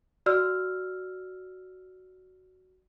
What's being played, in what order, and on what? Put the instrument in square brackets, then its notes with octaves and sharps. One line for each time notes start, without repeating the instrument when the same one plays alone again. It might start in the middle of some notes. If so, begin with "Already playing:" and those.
[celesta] F#4 D5 E6 F6